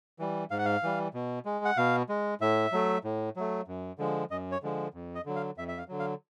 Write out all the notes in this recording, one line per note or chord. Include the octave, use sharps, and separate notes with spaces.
E3 G3
G#2 F5
F#5
F5
E3 G3
B2
G#3
F#5
B2 F5
G#3
A2 E5
F#3 A3
A2
F#3 A3
F#2
D3 F3 G#3
F#2 D#5
C#5
D3 F3 G#3
F2
D#5
D3 F#3
F5
F2 E5
E5
F5
D3 F#3
F5